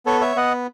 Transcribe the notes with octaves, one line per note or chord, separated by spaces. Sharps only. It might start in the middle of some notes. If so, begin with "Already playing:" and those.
B3 A4 C#5
C#5 E5
B3 D#5 F#5